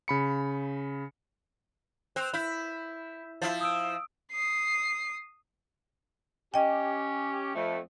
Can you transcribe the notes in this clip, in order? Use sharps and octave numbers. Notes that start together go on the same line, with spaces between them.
C#3 B5 C#7
C4 F#6 F7
E4 B5 G6 B6
F3 E4 A6
D#6 E6 D7
D#6 C7
C#4 G4 D#5 G5
F2 A3